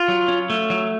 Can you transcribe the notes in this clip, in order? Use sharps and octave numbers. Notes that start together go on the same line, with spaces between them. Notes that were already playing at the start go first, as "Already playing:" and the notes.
Already playing: F4
F#3
C#4
A3
F#3